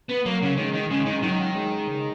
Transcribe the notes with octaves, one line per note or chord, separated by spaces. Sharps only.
B3
F#3 A#3
C#3
D#3 G#3
D#3
C#3 G#3
D#3
D#3 F#3
G#3
C#3